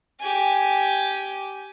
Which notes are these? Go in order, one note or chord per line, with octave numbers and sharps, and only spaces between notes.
G4 G#5